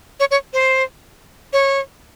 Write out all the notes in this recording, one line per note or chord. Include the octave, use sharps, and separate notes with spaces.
C#5
C#5
C5
C#5